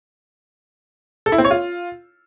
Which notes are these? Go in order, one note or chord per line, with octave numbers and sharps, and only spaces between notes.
A4
E4
C4
C#5
F4